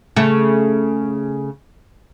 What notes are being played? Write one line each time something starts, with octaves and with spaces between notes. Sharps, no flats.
C#3 A3